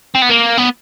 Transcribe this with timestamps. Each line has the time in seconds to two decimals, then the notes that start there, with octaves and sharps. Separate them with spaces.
0.15 C4
0.22 B3
0.29 A#3
0.58 B3